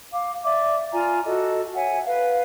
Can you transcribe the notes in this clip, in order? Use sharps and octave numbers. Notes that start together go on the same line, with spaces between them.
F5 D6
D5 E5 D6
F4 D5 G#5 A#5
F#4 A4 D#5
C#5 E5 F#5 G#5
B4 F5